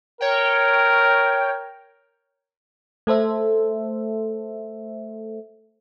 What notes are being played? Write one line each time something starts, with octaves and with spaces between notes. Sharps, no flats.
A#4 C#5 G5
A3 A4 C5 E5